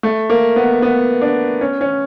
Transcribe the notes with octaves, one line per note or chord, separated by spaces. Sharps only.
A3
A#3
B3
B3
D4
C#4
C#4